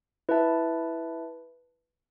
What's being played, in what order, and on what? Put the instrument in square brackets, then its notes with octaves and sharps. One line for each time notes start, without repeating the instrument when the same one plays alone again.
[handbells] E4 B4 E5 A5